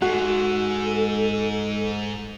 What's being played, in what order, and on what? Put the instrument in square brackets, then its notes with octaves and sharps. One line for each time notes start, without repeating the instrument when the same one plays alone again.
[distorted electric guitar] G#2 [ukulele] F#4 [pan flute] A4